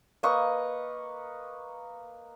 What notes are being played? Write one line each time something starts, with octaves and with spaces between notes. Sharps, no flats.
A#3 B4 D#5 C#6